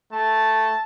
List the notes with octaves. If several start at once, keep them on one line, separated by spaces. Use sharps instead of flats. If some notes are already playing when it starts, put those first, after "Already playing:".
A3 A5